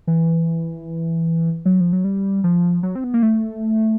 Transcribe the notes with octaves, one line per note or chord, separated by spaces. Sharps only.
E3
F#3
F3
F#3
G3
F3
F#3
C4
B3
A#3
A3